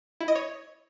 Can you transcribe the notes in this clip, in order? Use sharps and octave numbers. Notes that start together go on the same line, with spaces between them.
E4
D#5
C#5